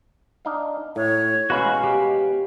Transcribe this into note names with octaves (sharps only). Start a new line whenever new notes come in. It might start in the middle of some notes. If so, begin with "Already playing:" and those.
D4 D#4 F5
A2 C#5
B2 G#3 C#4 F#4 F5 B5 C#6
G4